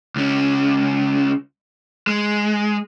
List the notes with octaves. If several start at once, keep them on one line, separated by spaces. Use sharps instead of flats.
C#2 C#4
G#3